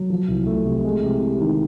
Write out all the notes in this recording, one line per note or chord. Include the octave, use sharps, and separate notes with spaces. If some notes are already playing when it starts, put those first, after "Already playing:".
Already playing: F#3
F3
C2
A3
C3
G#3
C3
C3
D#3